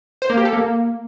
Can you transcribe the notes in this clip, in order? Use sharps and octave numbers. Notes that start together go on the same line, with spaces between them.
C5
A#3
G4
A4
A#3